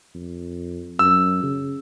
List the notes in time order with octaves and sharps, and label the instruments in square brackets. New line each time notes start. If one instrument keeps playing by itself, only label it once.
[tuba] F2
[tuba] F#2 [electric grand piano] E6
[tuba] C#3